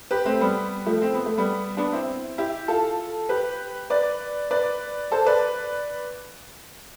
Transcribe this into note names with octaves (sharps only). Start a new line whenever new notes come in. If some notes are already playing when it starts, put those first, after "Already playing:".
G4 B4
A3 C4
G3 B3
F3 A3
C4
B3
A3
G3 B3
B3 D4
C4 E4
E4 G4
F4 A4
G4 B4
B4 D5
B4 D5
A4 C5
B4 D5